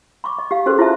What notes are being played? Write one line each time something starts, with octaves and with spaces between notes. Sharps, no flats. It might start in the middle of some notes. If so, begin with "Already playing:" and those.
B5 C#6 D6
D#5
G4 F5
C#4 F#4 G#4 A4 B4 C5
E4 F4 C5 D5 E5 A5